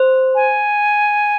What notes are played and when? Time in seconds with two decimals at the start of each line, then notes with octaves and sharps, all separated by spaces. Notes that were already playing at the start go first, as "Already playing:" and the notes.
Already playing: C5
0.35 G#5